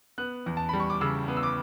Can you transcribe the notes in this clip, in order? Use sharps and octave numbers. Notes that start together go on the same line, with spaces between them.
B3 F#6
E2
A5
G3 B5
C#6
D6
C#3 E6
B3
E6
D6